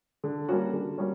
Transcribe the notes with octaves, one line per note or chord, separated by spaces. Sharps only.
D3
G3 A#3 C#4 F#4
D3
G3 A#3 C#4 F#4